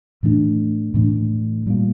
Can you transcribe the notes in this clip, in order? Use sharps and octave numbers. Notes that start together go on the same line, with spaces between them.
A2 E3 A3 D4
A2 E3 A3 D4
A#2 G3 A#3